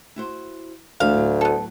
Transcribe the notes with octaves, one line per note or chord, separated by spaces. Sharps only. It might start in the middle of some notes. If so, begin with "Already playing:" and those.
E4 F#4 C5
D2 E3 A3 D4 F5
A2 F#3
B3 A4